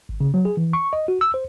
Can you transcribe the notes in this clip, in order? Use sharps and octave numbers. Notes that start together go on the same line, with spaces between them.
G#1
C#3
F#3
G#4
E3
C#6
D#5
F#4
E6
C5